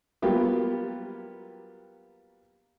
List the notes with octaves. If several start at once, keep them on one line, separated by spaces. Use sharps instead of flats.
F#3 G3 A#3 B3 F4 G4